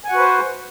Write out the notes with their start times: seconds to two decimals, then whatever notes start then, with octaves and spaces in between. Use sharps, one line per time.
0.04 G#5
0.08 F#5
0.12 F#4
0.16 B4
0.20 C5